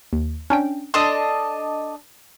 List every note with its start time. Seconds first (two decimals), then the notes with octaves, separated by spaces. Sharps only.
0.13 D#2
0.50 C#4 D4 G5
0.94 D4 A4 D#5 C6